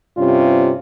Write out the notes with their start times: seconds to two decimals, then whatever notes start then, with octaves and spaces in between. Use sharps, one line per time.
0.18 G2 C3 C#4 F4